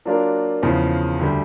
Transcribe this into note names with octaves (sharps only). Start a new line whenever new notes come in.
F#3 A#3 D4 F4 A#4
E2 C#3 F3
D2 D3 G3